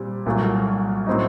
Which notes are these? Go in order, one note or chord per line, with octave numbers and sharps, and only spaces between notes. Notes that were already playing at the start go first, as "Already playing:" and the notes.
Already playing: A#2 G3 C4 G4
C2 A#2 F#3 A3
A2 F#3 C4 D#4